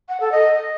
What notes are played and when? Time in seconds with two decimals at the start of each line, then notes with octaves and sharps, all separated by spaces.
0.09 F#5
0.20 A4
0.32 D#5